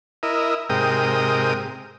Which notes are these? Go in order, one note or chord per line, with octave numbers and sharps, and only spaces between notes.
E4 A#4 D#5
G#2 C3 A#4 G5 D#6